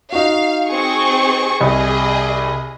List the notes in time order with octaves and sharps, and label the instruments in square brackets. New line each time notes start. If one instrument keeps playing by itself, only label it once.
[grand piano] D#4 F#4 [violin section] F5
[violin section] C4 G#4 C#6
[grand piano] C2 [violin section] G#4 D#5